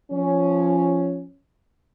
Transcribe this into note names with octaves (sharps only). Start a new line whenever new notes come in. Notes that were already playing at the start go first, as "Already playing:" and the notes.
F3 C#4